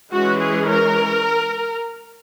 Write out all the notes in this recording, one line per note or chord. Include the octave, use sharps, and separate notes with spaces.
E3 G#3 C#4 F#4
G#4
A#4